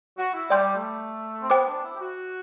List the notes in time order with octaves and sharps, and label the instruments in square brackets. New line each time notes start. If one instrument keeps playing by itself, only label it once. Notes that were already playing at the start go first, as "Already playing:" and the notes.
[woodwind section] F#4
E4
[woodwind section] G3 [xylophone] D5 G5 C6 G6
[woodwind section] A3
C4
[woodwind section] B3 [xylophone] C5 G5 D6
[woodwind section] D4
E4
G4
F#4